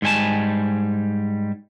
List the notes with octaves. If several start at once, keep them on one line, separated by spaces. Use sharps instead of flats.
G#2 G3 G#5 A5